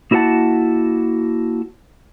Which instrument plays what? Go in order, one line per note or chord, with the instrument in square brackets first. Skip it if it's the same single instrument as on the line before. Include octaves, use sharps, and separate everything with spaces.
[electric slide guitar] A#3 E4 F#4 A4 F#5 A5